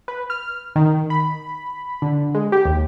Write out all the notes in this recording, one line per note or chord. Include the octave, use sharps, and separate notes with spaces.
B4
F6
D#3
B5
D3
G#3
G4
D#2